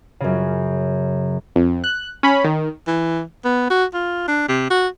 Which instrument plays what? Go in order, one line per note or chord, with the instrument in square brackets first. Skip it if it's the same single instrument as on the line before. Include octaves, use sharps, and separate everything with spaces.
[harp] F#2 C#3
[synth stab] F2
F#6
C#4 B5
D#3
[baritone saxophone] E3
B3
F#4
F4
D4
C3
F#4